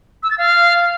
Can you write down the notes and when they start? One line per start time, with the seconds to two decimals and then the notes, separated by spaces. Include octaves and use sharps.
0.23 E6
0.30 A6
0.38 F5